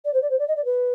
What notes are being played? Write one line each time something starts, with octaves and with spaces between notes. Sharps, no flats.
D5
C5
D5
C5
D5
D#5
D5
B4